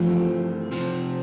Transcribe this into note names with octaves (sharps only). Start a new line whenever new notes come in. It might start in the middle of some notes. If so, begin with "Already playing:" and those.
Already playing: G2 E3 F3 A3 C4
C3 F3 C4